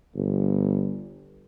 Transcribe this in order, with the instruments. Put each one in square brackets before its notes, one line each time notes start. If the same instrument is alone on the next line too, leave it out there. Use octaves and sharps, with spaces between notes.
[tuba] G1